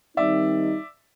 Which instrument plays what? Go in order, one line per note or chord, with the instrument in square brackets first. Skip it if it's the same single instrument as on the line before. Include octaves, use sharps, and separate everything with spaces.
[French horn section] D#3 G3 C4 D#4 [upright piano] D5 E5